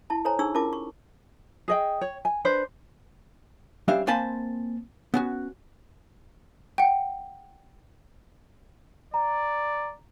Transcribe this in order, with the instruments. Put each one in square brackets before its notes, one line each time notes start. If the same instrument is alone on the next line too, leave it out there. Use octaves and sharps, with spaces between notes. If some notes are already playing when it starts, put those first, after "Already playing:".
[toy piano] E4 A5
A4 C5 C#5 G#5 A#5
D4 D#4 G#4 C#6 E6
C#4 E4 F4 A#4 A5 D6
C#6
[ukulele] G#4 D#5 G5
C#5
G#5
D4 B4 C5
[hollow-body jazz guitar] G3 C#4 D4 C5 E5 F5
A#3 C4 C5 G#5 A5 B5
B3 C#4 F#4
[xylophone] F#5 G5
[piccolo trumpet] D5 [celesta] A#5